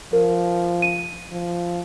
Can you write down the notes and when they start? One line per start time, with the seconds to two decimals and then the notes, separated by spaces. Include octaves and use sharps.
0.13 F3 A#4
0.82 D#7
1.31 F3